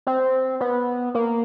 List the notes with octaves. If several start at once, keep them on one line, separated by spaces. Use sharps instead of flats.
C4
B3
A#3